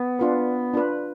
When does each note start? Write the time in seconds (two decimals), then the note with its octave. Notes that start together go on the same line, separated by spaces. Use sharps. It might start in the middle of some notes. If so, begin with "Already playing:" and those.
Already playing: B3
0.19 D4 F4 B4
0.73 D4 F4 B4